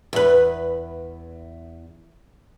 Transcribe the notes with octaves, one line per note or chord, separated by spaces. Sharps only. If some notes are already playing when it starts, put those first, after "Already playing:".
E2 B4